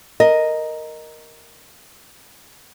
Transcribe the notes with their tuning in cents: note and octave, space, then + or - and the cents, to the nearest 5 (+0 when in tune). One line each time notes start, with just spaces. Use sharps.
A#4 +0 D#5 +0